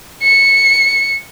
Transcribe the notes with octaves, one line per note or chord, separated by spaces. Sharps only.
C#7